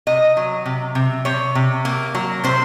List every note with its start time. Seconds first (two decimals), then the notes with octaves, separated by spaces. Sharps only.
0.07 C3 D#5
0.37 F#3
0.66 C3
0.95 C3
1.25 C3 C#5
1.55 C3
1.85 A#3
2.15 F#3
2.44 C3 C5